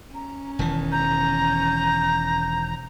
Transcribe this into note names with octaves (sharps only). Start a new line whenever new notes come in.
C#4 A#5
E1 D#3 E3 A5
A#5 G6